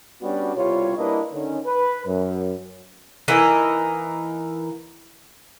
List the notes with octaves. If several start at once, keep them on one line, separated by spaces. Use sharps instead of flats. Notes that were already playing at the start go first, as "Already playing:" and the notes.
G3 B3 C#4 D4 F#4
C2 B2 G3 F4 C#5
G3 A#3 D4 E4 B4 D#5
D3 D#3 C#4
B4
F#2
E3 A#3 D#4 D#5